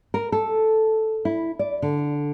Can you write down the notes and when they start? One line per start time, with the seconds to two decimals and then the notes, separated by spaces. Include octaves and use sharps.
0.14 A#4
0.32 A4
1.25 E4
1.59 D5
1.82 D3